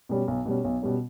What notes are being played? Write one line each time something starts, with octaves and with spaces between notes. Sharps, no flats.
B2 G3 C#4
B1
B2 G3 C#4
B1
B2 G3 C#4